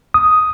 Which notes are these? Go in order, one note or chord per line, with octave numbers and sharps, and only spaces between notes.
D#6